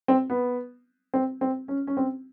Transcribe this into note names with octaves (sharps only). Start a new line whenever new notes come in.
C4
B3
C4
C4
C#4
C#4
C4